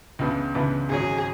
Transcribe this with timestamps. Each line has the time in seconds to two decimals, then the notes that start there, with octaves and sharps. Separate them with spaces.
0.19 C#2 C#3 E3 B3 D4
0.54 C#2 C#3 E3 B3 D4
0.90 G#1 G#2 F#3 C#4 G#4